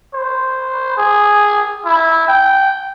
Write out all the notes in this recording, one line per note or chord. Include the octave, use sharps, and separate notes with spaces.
C5
G#4
E4
G5